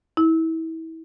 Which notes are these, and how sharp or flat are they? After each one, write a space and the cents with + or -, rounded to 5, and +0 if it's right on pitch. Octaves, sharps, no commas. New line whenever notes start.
E4 -30